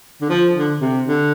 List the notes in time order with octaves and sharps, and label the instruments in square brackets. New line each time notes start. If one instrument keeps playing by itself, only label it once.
[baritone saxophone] D3
F3
D3
C3
D3